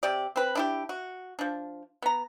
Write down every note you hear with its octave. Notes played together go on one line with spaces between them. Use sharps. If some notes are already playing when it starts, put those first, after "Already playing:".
C3 G4 D5
C4 B4
D4 E4 G4
F#4
F3 D4
B3 A#5